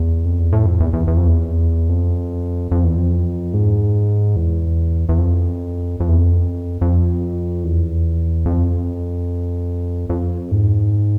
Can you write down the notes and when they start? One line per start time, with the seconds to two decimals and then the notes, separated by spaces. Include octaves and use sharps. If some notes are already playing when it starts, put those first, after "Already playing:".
Already playing: E2
0.25 F2
0.39 E2
0.52 A2
0.66 F2
0.80 E2
0.93 E2
1.07 E2
1.17 F2
1.28 E2
1.89 F2
2.71 F2
2.84 E2
2.97 F2
3.54 G#2
4.36 E2
5.09 E2
5.18 F2
6.00 F2
6.08 E2
6.18 F2
6.81 F2
7.64 E2
8.46 F2
10.10 F2
10.51 G#2